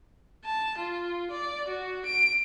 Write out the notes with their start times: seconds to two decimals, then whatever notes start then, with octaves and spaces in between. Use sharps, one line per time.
0.45 A5
0.78 F4
1.31 D5
1.68 F#4
2.06 D7